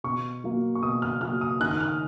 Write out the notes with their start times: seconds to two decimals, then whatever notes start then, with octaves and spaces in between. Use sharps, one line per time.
0.04 B2 C#6
0.44 F#3 A#3
0.75 C#6
0.82 B2 D#6
1.02 F6
1.21 F#3 A#3 F6
1.41 D#6
1.60 D#3 F#6
1.71 F#6
1.80 F6